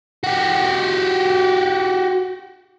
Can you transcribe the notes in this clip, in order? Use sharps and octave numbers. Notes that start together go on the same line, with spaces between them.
F#4 G4